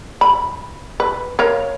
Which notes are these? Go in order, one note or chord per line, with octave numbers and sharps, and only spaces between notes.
B5
B4
A#4 C#5 F5